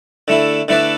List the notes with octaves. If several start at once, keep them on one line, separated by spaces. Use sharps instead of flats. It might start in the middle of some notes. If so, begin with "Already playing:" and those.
D3 A3 E4
D3 A3 E4 B4 D5